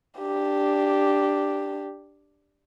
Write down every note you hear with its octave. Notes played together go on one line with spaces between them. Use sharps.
D4 G4